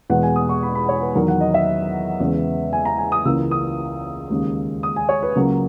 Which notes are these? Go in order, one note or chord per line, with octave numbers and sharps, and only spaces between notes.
E2 B2 G#3 B3 F#5
G#5
D#6
C#6
B5
B5
C#5
B4
E2 D#3 F#3 A#4
F#5
D#5
E5
E2 C#3 G#3 B3
G#5
A#5
G#5
D#6
C#2 C#3 E3 A#3 E6
D#6
D#2 C#3 G#3
D#6
G#5
C#5
B4
C#2 C#3 F#3 A#3